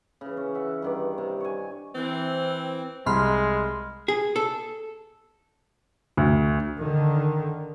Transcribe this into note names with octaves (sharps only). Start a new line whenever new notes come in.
C#3 E3
C#4
E5 F#5
G2 D#3 D5
C3
C#5 G#5
E3 C4
C2 G#3 B5 C6 F6
G#4
A4
D2
D3 D#3